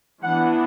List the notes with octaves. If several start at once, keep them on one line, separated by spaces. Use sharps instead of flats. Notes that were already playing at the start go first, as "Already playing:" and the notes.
E3 B3 D4 F#5